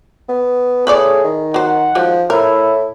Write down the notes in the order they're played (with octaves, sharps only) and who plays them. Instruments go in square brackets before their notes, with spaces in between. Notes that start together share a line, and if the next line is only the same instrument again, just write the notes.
[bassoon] B3
[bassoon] A2 [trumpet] G#4 [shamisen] B4 C#5 D5
[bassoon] D#3
[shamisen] F#3 C5 [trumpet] F#5
[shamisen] D#3 F#3 G#3 [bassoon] F3
[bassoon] A2 [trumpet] E4 [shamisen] A#4